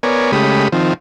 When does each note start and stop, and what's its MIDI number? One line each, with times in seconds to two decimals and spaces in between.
0.03 0.32 59
0.03 0.32 70
0.03 0.32 73
0.03 0.32 74
0.03 0.32 80
0.32 0.68 49
0.32 0.68 56
0.32 0.68 57
0.32 0.68 67
0.32 0.68 83
0.32 0.68 87
0.72 0.93 51
0.72 0.93 53
0.72 0.93 60